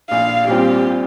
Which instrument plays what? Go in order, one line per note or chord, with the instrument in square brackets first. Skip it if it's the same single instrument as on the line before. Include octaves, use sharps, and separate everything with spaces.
[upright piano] A#1 [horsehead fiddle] F5
[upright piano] A#2 G3 C4 F4 [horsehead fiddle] G4